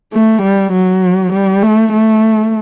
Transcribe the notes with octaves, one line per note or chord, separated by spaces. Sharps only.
A3
G3
F#3
G3
A3
A3